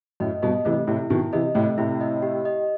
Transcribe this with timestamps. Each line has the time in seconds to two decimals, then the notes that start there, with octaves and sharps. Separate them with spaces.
0.20 F#2 A2 D#5
0.42 G2 B2 D#5
0.65 C3 E3 A3
0.87 A2 C3 E4
1.10 B2 D#3 E4
1.33 C3 E3 D#5
1.55 A2 C3 A3
1.78 A2 C3 E4
2.01 D#5
2.22 G4
2.45 D#5